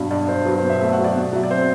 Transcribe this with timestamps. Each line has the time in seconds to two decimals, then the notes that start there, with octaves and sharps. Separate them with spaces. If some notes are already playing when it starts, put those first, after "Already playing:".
Already playing: G2 B2 F#3
0.11 G2 D5
0.28 G2 C5
0.45 F#3 B4
0.58 C5
0.63 B2
0.69 E5
0.81 A3 E5
0.93 F#5
0.98 F#3
1.04 D5
1.16 B2
1.33 F#3 E5
1.43 D5
1.51 C4 C5